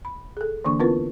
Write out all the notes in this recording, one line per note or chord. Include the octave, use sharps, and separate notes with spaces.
B5
G#4 A4
D3 E3 A#3 D4 C#6
B3 C4 E4 F4 A#4 B4